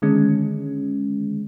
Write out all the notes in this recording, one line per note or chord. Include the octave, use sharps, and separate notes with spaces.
D3 D#3 G#3 C#4